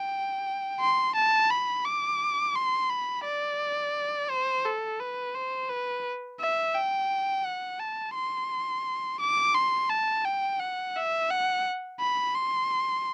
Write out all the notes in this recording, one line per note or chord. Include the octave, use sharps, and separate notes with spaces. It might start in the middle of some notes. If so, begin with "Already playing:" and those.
Already playing: G5
C6
A5
B5
D6
C6
B5
D5
C5
A4
B4
C5
B4
E5
G5
F#5
A5
C6
D6
C6
A5
G5
F#5
E5
F#5
B5
C6